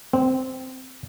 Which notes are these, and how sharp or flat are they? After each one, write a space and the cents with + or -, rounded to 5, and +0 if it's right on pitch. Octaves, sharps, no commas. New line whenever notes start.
C4 -10